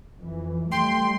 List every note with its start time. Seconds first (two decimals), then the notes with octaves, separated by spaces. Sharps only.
0.19 F2 E3
0.72 G3 A3 G5 C6